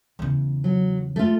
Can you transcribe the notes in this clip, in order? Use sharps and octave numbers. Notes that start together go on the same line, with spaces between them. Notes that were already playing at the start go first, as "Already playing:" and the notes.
E2 C#3
F#3
A3 F4